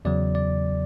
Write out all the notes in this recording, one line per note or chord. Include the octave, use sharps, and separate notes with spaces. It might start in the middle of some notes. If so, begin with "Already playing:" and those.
E2 C#3 F#3 D5
D5